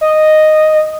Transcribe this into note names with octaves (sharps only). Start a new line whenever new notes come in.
D#5